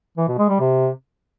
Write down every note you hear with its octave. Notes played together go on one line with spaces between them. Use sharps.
E3
B2
G#3
G3
C3